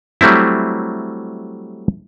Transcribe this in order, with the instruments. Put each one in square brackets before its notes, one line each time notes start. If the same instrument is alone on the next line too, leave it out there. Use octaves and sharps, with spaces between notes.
[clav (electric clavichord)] F#3 G3 A3 C4 E4